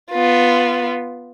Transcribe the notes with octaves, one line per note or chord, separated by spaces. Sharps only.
B3 F4